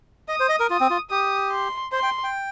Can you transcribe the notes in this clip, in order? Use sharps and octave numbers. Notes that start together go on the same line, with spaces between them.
D#5 D#6
C5
D#5
A#4
F4 D#6
C4
F4
G4 D#6
C6
C5 C6
G5
G5